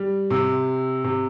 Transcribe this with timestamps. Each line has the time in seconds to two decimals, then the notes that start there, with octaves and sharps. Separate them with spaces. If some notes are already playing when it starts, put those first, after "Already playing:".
Already playing: G3
0.30 C3
1.04 C3